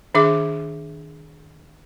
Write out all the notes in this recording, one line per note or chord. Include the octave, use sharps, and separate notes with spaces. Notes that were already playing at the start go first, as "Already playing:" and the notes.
D#3 D4 G#4 E5 D6